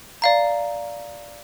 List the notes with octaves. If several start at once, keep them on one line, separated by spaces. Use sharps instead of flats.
D5 F5 A#5